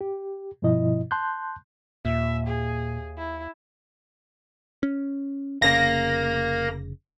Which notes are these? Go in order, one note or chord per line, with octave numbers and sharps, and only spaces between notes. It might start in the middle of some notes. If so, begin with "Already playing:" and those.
G4
G2 B2 F3 E4 D#5
A5 C6 F#6 G6
D#2 A#2 E5
G#4
E4
C#4
F1 C#3 A#4 F5 A#6